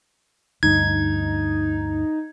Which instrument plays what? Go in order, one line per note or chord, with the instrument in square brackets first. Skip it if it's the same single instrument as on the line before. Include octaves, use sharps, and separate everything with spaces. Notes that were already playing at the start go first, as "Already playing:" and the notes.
[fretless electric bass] D2 G2 [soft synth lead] D#4 [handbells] G#6